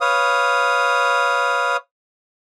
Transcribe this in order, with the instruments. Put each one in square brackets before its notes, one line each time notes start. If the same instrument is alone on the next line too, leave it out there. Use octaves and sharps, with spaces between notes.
[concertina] B4 C#5 F5 D#6